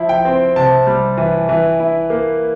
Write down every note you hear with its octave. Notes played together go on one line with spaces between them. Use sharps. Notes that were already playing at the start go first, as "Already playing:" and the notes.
Already playing: F3 E4
G5
C4
C3 A5
G3
E3
E3
E4
A#3